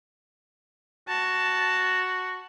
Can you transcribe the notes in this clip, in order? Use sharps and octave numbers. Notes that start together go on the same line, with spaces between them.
F#4 A5